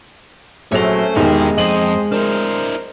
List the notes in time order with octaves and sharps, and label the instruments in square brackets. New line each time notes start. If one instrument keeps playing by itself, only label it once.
[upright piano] A#1 F#3 F7 [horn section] A3 C#4 [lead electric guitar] C5 C#5
[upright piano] E1 D#3 G4 [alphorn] G#3 [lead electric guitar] D#4 G#4
[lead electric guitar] F2 [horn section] C4 C5 D#5 [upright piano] F#7
[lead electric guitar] D4 E4 [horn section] A#4 C5